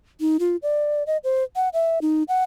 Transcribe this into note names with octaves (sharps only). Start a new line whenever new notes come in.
D#4
F4
D5
D#5
C5
F#5
E5
D#4
F#5